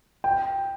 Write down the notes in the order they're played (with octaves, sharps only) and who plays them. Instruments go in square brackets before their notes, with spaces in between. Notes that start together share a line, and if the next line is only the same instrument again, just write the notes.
[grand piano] G5